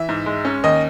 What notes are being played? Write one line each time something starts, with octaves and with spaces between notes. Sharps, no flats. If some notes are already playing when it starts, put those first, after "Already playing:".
Already playing: E3 E5
G#2
G#3
C#4
D#2 D#5